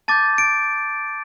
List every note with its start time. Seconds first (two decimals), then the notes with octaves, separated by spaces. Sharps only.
0.08 A5 D6 G6 A6
0.38 D7